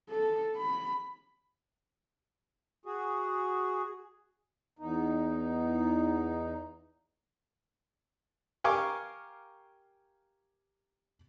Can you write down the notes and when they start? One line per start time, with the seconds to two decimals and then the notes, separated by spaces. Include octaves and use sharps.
0.10 A4
0.58 B5
2.86 F#4 G#4
4.79 E2 D#4
8.64 G4 A#4 F5 G#5 C#6 D6